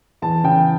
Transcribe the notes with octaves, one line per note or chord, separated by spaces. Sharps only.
E2 A5
C#3 G5